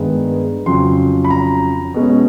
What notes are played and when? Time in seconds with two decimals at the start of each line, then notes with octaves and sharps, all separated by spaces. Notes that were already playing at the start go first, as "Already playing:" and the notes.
Already playing: G2 D#3 G#3 B3
0.66 F2 C#3 F#3 C6
1.24 B5
1.30 A#5
1.94 B2 G#3 C#4